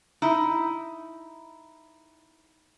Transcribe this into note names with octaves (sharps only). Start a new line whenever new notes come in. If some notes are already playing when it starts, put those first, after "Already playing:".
D#4 E4